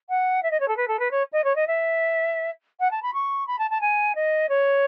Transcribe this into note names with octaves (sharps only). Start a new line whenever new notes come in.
F#5
E5
D#5
C#5
A4
B4
A4
B4
C#5
D#5
C#5
D#5
E5
F#5
A5
B5
C#6
B5
A5
A5
G#5
D#5
C#5